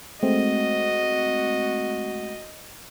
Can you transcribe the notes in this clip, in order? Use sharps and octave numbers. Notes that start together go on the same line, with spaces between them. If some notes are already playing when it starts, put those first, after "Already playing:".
G#3 A3 C4 F#4 D#5